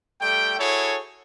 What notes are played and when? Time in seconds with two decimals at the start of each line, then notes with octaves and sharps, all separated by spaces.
0.21 G3 A3 G5
0.59 E4 F#4 G#4 A4 C#5